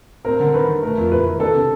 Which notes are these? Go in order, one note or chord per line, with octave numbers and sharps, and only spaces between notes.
C4 A#4
D3
D#3 B4
D#3
A3 A#4
F2
E4 B4
D#3
D4 A4
C3